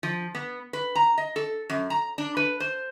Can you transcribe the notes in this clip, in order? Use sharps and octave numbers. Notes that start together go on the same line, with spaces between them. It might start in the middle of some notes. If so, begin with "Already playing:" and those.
F3
B3
B4
A#5
D#5
A4
F#2
A#5
D4
B4
C5